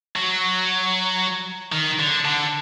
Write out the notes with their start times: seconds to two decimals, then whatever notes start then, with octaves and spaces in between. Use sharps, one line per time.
0.16 F#3
1.72 D#3
1.99 D3
2.25 D3